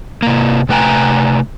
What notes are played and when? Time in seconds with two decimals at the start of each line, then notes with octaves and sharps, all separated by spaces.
0.22 C3 A#3
0.69 C3 A3 B4 G5 G#5 A#5